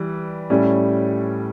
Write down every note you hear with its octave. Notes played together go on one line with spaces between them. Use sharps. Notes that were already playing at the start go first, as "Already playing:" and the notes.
Already playing: E3 G3
A2 G3 C#4